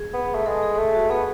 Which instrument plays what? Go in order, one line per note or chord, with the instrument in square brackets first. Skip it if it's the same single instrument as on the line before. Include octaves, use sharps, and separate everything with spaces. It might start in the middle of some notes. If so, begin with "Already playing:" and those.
Already playing: [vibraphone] G#4
[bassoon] B3
A3
[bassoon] G#3 [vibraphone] A4
[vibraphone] G#4
[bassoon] A3 [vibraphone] G#4
[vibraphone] F#4
[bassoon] B3 [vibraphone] G#4